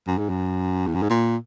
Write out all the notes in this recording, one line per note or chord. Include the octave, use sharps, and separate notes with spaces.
F#2
G#2
F#2
E2
F#2
G#2
A#2